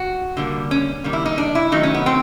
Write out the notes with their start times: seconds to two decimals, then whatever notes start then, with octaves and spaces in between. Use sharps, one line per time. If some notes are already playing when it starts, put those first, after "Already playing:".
Already playing: F#4
0.37 D3 G3 A#3
0.71 C#4
1.04 D#3 G3 A#3
1.13 E4
1.26 D#4
1.38 D4
1.55 E4
1.72 D#3 F#3 A3 D#4
1.83 C#4
1.94 B3
2.06 C4